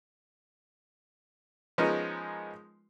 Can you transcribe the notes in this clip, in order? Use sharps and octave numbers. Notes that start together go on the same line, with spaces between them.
F3 G#3 B3 C#4 D#4 A#4